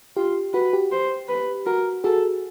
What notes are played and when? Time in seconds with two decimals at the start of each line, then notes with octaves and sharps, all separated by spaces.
0.17 F4 G4
0.54 F#4 B4
0.73 G4
0.92 C5
1.29 B4
1.66 F#4 A#4
2.04 F#4 G#4 A4